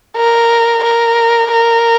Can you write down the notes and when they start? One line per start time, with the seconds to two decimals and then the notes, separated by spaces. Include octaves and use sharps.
0.16 A#4
0.83 A#4
1.51 A#4